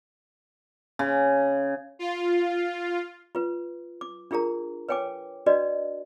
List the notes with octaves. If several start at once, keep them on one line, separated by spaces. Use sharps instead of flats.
C#3
F4
F4 B4
D6
D4 F4 G#4 A#4 A#5
B4 C#5 G5 G#5 D6
D4 F#4 B4 D5 D#5